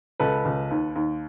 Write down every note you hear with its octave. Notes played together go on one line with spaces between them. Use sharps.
C#2 A4 B4
C#2
D#2
D#2